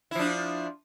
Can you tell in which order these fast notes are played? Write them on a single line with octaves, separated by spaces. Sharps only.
E4 F3 D4